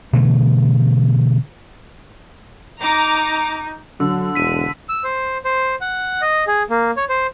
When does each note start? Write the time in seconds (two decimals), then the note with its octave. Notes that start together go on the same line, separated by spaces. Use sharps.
0.13 B2 D3 E3 A3
2.81 D#4 A#5 D6
4.00 D3 F#3 E6
4.35 E1 B6 D#7
4.89 E6
5.04 C5
5.45 C5
5.81 F#5
6.22 D#5
6.47 G#4
6.70 A#3
6.97 C#5
7.09 C5